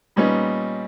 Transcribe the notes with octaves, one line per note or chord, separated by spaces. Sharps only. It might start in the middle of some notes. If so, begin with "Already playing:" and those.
A#2 G3 B3 C#4 D#4